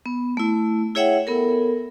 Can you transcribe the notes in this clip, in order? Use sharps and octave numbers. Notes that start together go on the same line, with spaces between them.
B3
A3 E4
E4 G#4 C#5 E5 F#5 G5
B3 A4 A#4